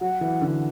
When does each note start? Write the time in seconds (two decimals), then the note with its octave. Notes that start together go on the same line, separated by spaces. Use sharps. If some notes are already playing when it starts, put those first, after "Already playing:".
0.01 F#3 F#5
0.21 E3
0.41 D3